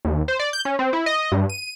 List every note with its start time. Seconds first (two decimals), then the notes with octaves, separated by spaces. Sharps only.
0.05 D#2
0.28 C5
0.39 D5
0.53 G6
0.65 C#4
0.79 C4
0.93 E4
1.06 D#5
1.32 G2
1.49 D#7